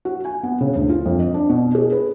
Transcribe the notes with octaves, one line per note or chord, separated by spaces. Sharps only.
F#4
G#5
B3
C#3
D2
F4
F2
D#5
D4
B2
G#4
B4